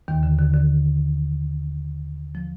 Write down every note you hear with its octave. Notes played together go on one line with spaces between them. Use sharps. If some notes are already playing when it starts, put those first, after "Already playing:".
D#2 D#3
D3
D3
D3
F3